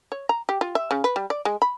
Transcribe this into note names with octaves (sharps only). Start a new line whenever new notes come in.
C#5
A#5
G4
F4
E5
C#3
B4
G3
D5
G#3
B5